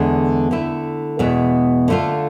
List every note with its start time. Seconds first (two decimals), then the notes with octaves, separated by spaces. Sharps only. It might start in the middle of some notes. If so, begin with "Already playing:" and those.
Already playing: E2 D3 G#3
0.51 D3 A3 E4
1.19 E2 B2 G#3 B3 E4
1.88 D3 A3 D4 F4